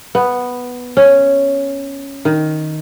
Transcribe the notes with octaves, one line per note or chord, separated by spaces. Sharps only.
B3
C#4
D#3